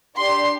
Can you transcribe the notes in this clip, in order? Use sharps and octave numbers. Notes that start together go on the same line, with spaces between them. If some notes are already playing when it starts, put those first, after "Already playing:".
D4 G4 C6